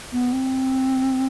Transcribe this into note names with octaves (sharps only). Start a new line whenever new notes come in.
B3
C4